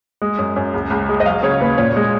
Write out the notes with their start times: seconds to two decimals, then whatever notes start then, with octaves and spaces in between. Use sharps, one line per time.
0.22 G#3
0.38 F#2
0.56 F#2
0.74 C#2
0.90 C#2
1.09 G#3
1.20 D#5
1.26 F#3 F5
1.43 C#3 C#5
1.60 D#2 B4
1.78 A#2 C#5
1.96 G#3